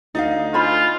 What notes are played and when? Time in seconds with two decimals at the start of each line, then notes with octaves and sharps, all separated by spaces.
0.15 D2 D#4 D5 D#5 F5
0.54 F4 C5 G#5 B5